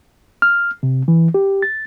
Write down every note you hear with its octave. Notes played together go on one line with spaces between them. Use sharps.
F6
C3
E3
G4
A6